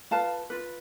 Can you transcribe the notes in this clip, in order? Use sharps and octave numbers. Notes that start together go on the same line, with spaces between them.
F4 B4 F5 A5
F4 B4